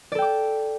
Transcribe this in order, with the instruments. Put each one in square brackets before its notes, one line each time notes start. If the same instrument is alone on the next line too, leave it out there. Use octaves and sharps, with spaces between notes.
[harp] D5
A4
G5
D6